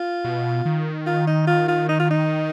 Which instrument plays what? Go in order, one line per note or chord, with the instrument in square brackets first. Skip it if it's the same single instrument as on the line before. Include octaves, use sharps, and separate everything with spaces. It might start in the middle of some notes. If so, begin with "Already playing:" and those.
Already playing: [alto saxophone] F4
[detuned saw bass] B2
D#3
[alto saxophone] F4
D#4
F4
F4
D#4
F4
D#4